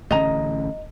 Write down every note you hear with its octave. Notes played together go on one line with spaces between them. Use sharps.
A1 D3 C#4 D#5 A#5